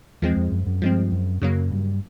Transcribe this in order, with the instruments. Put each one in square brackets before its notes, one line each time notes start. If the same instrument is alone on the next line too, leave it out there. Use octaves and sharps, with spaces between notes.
[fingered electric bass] E2 [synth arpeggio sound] F3 G#3 C4
[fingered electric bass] F2
F#2
F#2
[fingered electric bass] G2 [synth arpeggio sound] F3 G#3 C4
[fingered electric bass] F#2
[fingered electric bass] F#2 [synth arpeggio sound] C#3 F#3 A#3
[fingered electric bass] G2